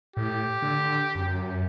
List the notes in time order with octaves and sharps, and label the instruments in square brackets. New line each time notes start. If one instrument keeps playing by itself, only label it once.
[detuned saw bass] A2 [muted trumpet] G4
[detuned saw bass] D3
F#2